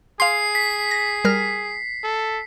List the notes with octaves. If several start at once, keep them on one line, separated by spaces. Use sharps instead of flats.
G#4 F5 C6 C7
B6
A#6
G3 A#4 F6
A4